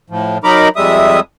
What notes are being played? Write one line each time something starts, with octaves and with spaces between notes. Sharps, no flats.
A2 F3
F#3 D#4 A#4 A#5 B5 D6
F2 G3 G#3 E5 D#6